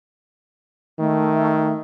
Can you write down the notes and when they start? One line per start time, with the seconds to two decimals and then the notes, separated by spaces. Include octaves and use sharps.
0.99 D#3 A3